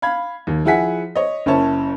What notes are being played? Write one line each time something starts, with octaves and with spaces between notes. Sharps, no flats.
F5 B5 G#6
D#2
F3 E4 G#4 F#5 G#5 B6
C#5 D#5
F#1 C#4 E4 C#5 A5